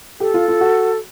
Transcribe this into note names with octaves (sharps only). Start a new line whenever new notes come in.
G4 A4
F4
F4
F#4